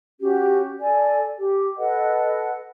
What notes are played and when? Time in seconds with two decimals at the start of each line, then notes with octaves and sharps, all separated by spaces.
0.20 C#4 F#4 G4
0.80 A4 D5 G#5
1.37 G4
1.77 A4 B4 D#5 F#5